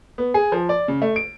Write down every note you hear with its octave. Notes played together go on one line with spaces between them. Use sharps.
B3
G#4
F3
D5
C#3
A3
D7